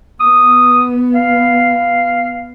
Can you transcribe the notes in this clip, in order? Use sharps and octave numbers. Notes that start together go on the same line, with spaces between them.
B3 D#6
F5